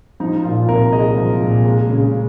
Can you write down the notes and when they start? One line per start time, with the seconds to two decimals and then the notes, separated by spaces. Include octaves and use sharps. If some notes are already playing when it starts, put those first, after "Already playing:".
0.20 F3 D#4
0.44 A#2 F4
0.68 C2 A#4
0.93 G#3 D#5
1.17 F3
1.41 A#2
1.66 G#3
1.89 C#3